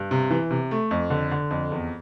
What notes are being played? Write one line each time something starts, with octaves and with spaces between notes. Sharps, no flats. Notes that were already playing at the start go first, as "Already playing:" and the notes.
Already playing: G2
C3
E3
C3
A3
F2
D3
D3
F2
E2